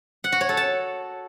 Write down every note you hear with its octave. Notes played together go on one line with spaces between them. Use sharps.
F#5
F#4
C#5
A4
A5